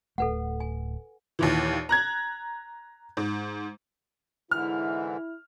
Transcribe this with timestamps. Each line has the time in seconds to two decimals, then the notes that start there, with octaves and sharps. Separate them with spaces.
0.18 D1 A3 A4 B4 F#5
0.60 G#5
1.39 D#2 A#2 E3
1.89 A#5 F#6 G#6
3.17 G#2
4.51 G#2 D3 E3 E4 F6